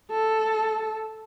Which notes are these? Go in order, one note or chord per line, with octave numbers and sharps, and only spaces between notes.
A4